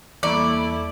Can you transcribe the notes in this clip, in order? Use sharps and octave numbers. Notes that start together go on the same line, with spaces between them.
E2 G3 A#3 E4 A4 D5 C#6